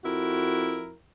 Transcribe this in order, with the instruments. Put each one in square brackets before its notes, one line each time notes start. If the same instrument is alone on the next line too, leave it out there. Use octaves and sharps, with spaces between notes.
[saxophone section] F2 E4 F#4 A#4